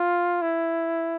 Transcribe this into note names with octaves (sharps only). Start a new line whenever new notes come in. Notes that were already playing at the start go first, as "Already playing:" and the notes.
Already playing: F4
E4